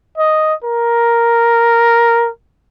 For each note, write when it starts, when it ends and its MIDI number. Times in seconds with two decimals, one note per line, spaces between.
0.18 0.54 75
0.64 2.29 70